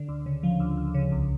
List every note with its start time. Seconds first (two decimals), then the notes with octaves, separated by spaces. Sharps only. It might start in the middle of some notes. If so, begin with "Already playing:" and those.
Already playing: D3
0.08 D2
0.26 C#3
0.43 F3
0.60 D2
0.77 D2
0.94 C#3
1.12 C2